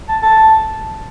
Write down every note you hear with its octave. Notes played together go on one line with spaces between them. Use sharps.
A5
A5